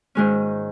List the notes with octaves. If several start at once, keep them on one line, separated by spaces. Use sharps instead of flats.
G#2 D#3 G#3 C#4